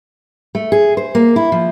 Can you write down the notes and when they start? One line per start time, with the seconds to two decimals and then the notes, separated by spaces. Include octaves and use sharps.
0.55 A3
0.72 G#4
0.97 C5
1.15 A#3
1.36 E4
1.52 F3